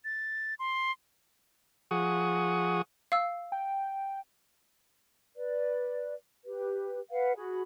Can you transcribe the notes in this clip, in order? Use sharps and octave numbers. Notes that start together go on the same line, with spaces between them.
A6
C6
F3 G#4 F#5 C#6 D#6
F5 E6
G5
B4 D5
G4 B4
B4 F5 F#5
F#4 G#4 B5